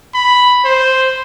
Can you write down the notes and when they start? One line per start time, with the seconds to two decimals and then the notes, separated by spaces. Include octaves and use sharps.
0.14 B5
0.65 C5